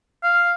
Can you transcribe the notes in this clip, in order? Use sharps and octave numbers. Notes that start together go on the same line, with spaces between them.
F5